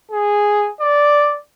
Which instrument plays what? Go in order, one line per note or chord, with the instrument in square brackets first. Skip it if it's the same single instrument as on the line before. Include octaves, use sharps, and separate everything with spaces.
[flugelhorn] G#4
D5